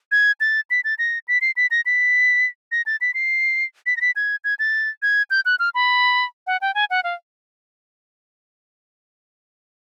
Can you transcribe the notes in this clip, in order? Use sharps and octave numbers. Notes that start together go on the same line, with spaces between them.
G#6
A6
B6
A6
A#6
B6
C7
B6
A#6
B6
A#6
A6
B6
C7
B6
A#6
B6
G#6
G#6
A6
G#6
G6
F#6
F6
B5
F#5
G5
G#5
F#5
F5